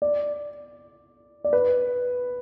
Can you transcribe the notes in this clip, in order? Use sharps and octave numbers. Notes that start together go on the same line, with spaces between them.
D5
D5
B4